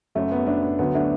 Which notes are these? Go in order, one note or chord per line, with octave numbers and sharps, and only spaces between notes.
F#1 F#2 F#3 A3
B3
A3 D4
B3
D2 D3 F#3 B3
A3 D4